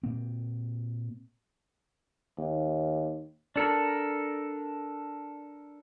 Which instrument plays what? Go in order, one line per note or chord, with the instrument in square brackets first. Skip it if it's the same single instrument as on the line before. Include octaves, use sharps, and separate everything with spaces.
[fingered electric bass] A#2 A#3 C4
[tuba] D#2
[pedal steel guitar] D4 A4 A#4